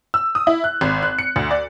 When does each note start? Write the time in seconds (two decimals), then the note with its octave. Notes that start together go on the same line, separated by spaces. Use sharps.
0.14 E6
0.35 D#6
0.47 E4
0.64 F#6
0.81 G#1
1.03 F#6
1.19 C#7
1.36 D2
1.51 D5